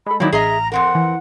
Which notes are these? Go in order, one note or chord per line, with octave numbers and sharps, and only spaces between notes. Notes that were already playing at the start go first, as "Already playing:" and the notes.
G#3 A4 B5
D#3 F#3 A#3 D#4 E4 D5
A1 G#4 D#5 E5 A#5
F2 C4 A#4 F#5
E3